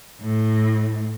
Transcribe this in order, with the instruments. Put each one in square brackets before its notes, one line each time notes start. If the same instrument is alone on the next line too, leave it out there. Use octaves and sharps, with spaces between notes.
[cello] A2